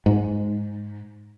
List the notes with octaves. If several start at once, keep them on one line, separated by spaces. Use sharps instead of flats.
G#2